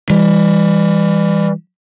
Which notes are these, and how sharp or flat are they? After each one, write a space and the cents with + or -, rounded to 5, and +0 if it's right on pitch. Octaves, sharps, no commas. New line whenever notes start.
E3 +0 G3 +35